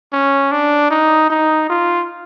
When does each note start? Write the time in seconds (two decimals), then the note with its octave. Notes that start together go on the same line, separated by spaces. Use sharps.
0.13 C#4
0.52 D4
0.91 D#4
1.30 D#4
1.70 F4